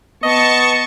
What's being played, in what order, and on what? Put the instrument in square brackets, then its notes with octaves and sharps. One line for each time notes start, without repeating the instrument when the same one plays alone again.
[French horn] B3 [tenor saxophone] D#5 [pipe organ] A5 C#6